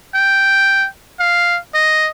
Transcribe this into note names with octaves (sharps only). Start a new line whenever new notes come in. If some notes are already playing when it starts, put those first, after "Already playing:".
G5
F5
D#5